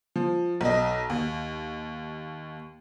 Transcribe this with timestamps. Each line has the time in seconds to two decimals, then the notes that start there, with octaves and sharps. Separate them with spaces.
0.16 F3
0.61 B1 D#5
1.10 D#2